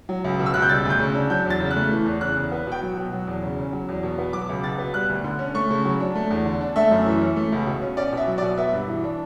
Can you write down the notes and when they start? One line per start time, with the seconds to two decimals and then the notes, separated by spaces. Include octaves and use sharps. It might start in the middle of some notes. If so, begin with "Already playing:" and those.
0.09 F#3
0.24 C#2
0.39 B2
0.46 E6
0.54 C#2 F#6
0.62 G6
0.69 G3 A6
0.85 D2 G6
1.00 C#3
1.15 D4
1.30 F#3 G6
1.46 E2 A6
1.60 C#3
1.71 F#6
1.76 A3
1.91 E3
2.06 E2
2.21 C#3 F#6
2.37 E2
2.52 B3
2.67 B2 G5
2.82 F#3
2.97 B2
3.12 F#3
3.27 E2
3.43 C#3
3.58 C#4
3.73 F#3
3.89 E2
4.03 B2
4.18 B3
4.33 F#3 D6
4.49 C#2
4.64 B2 A6
4.78 B3
4.94 G3 F#6
5.09 D2
5.24 D3
5.39 C#4
5.55 A3 C#6
5.70 C#3
5.85 F#3
6.00 D4
6.15 A3
6.31 E2
6.45 D3
6.61 D4
6.76 A3 E5
6.91 F#2
7.06 E3
7.21 C#4
7.36 A3
7.52 C#2
7.67 B2
7.82 C#4
7.97 C#4 D5
8.12 B2 E5
8.27 F#3
8.38 D5
8.42 B2
8.58 B3 E5
8.73 G2
8.88 E3
9.04 D4